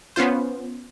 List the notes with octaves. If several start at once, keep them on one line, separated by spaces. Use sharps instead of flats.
B3 C#4 F4 C5